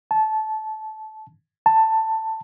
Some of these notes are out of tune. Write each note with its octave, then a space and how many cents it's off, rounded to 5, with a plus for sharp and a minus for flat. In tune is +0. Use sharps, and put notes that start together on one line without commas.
A5 -20
A5 +10